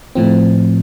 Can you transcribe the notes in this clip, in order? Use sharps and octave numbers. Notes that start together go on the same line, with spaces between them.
A2 F3 C4